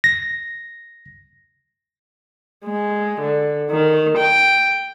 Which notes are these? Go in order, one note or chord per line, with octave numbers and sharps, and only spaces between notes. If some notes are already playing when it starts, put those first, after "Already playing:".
A#6
G#3
D3
D#3
G5